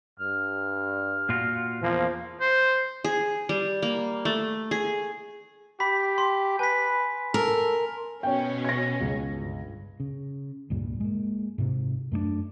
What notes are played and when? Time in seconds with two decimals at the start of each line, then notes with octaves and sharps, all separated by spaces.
0.19 G2 F6
1.29 A#2 F4 F#4
1.83 E2 F3 A#3
2.41 C5
3.04 G#4
3.49 G3
3.82 A#3
4.25 A3
4.71 G#4
5.80 G4 B5 B6
6.18 C6
6.59 B4 G#5 B6
7.34 A4 A#4
8.23 B2 C#4 C#5 G5
8.65 G#6 A#6
9.01 C#2
9.31 G1
10.00 C#3
10.70 C#2 G2 A#2
11.00 G#3 A#3
11.58 G#2 C3
12.12 F#2 A3 A#3 D4